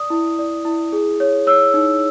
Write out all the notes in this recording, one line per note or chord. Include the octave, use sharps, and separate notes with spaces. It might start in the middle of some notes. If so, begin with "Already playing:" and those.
Already playing: D5 D#6
E4
D5
E4
G#4
C#5
C#5 E6
D#4